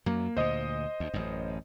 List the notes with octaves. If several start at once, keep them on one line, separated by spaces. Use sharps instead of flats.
F#2 F#3 A#3
D2 A#2 C5 D#5 D#6
D2
A1 F#2